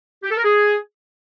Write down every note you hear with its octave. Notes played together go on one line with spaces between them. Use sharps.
G4
A4
A#4
G#4